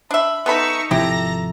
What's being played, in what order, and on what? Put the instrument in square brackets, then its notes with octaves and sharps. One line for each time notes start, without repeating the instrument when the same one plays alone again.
[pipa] D4 E5 [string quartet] B5
[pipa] B3 A4 B5 [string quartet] D#4 E5 C#6
[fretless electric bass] G#1 C3 F3 [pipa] E4 G4 [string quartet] A4 A#5 A#6